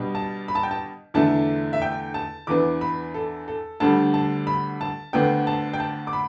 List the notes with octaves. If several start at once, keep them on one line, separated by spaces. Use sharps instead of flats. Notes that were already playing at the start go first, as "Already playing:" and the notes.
Already playing: B2 G3 D4
A5
B5
A5
G5
A5
E2 D3 A3 D4 A5
E5
G5
A5
E2 E3 B3 D4 D6
B5
A4
A4
D2 D3 G3 D4 A5
A5
B5
A5
D2 D3 B3 D4 G5
A5
G5
A5
D6
B5